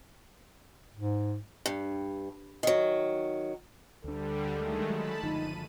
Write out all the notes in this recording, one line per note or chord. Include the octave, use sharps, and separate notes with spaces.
G#2
G2
D#3 F#3
D2 D3 G3 D4 A4
D#3 G#3 A3
F#3 A5 B5
F#1 D3 F3 D#4 D#7